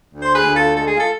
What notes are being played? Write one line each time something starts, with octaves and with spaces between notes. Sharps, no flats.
D2
C5
G#4 B4
D2
F4 A4
G#3 A4
G#4
F4 A4